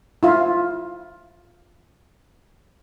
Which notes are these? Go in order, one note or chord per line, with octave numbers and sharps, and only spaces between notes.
E4 F4